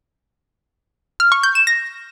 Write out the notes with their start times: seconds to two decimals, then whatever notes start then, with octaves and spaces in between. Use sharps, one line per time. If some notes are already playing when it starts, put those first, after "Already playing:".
1.20 F6
1.32 C#6
1.43 G6
1.55 E7
1.67 A#6